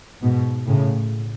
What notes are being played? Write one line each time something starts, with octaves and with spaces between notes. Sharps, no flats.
G#2 B2
A2 C#3